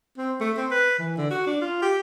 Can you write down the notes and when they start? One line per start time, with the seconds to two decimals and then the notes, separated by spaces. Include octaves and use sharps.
0.18 C4
0.40 A3
0.57 C4
0.71 B4
0.99 E3
1.17 D3
1.31 F#4
1.46 D4
1.61 F4
1.82 G4